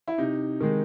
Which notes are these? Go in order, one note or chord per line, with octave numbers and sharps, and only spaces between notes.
E4
C3 D#4
D#3 G#3